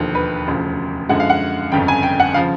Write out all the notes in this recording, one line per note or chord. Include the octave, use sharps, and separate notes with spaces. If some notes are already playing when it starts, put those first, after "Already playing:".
Already playing: E1 D#2 D3 F3
B4
E1 D2 C#3 F3
F#2 D3 F3 G#3 F#5
F5
F#5
G1 F2 C#3 G5
G#5
G5
F#5
C#3 F3 F5